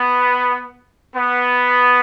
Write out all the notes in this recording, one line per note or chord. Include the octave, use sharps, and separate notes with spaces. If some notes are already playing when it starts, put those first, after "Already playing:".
Already playing: B3
B3